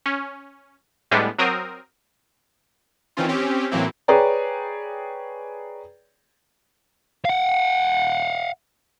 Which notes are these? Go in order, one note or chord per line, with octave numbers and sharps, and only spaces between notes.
C#4
A2 G3 G#3 B3 D4
F#3 C4 A#4 D#6
D#3 E3 C4 C#4 F4
C4 C#4 G4
A2 E3 F#3 A#3 C4 E4
G#4 B4 C#5 D5 G5 A#5
F5 F#5